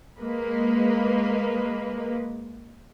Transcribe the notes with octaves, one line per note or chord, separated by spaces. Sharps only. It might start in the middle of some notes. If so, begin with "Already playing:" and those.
G#3 A#3 B4